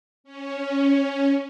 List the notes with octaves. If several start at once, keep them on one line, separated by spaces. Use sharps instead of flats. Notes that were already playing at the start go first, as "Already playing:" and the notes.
C#4